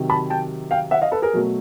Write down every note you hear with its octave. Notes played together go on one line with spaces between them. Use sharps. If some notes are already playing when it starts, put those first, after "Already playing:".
Already playing: C3 D#3 F#3
A5 B5
G5 A5
F5 G5
E5 F#5
D#5 F5
A4 B4
G#4 A#4
B2 F#3 A3